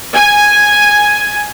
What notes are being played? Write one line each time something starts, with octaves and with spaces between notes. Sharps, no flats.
G#5